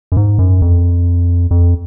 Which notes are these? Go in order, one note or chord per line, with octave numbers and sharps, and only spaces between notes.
F#2
G#2
F#2
F2
F2